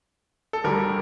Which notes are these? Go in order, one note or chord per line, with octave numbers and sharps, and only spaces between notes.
A4
D2 D3 G3 A#4